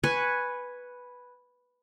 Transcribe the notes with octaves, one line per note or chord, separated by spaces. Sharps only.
B4 G#5 C#6